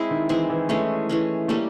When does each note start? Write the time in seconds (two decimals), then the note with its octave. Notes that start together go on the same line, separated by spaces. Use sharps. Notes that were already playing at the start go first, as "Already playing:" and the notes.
Already playing: G#3 C4 E4
0.11 D#3
0.29 E3 G#3 C4 E4
0.50 E3
0.69 E3 G#3 A3 C#4
1.09 E3 G#3 C#4
1.48 G3 A3 A#3 C#4